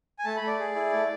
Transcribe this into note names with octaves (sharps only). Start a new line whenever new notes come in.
G#5
A3 A5
B5
A3
D5
G#4
E4
A3